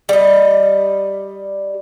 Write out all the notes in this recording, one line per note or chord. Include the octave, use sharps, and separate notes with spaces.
G3 D#5